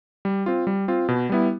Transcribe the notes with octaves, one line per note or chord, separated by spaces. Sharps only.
G3
C4 F4
G3
C4 F4
B2
G3 B3 E4